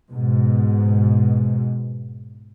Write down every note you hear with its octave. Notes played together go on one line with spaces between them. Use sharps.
G#2 B2